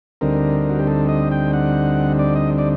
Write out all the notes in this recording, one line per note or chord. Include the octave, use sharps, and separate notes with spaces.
D2 D3 G3 C4 D#4 A#4
F#4
G4
A4
D#5
G5
F#5
D5
D#5
D5